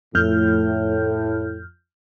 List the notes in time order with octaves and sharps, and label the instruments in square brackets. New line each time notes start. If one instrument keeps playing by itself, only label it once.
[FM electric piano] F2 F6 G6 [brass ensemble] A2